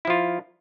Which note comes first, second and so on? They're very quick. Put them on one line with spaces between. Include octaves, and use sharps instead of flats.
E4 F3 F4